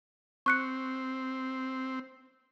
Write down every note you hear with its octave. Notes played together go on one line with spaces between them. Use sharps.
C4 C#6 F#6 C#7